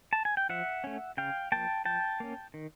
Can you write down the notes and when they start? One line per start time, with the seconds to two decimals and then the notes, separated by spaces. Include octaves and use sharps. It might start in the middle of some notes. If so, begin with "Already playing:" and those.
0.13 A5
0.25 G#5
0.37 G5
0.49 F3 E5 F#5
0.84 A3 C#4
1.17 C#3 F5 G5
1.52 F3 A#3 G5 A5
1.85 F3 G5 A5
2.20 A#3 C#4
2.54 D#3